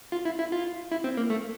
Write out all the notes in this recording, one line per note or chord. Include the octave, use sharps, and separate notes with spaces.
F4
E4
E4
F4
E4
C4
A#3
A3